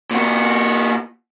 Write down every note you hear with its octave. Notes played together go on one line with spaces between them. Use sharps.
A#2 F#4